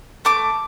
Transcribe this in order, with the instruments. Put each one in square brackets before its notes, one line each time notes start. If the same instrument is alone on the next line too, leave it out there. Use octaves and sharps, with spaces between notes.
[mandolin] A3 D6